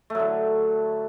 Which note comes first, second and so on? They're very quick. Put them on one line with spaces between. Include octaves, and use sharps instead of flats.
A3 F#3 D3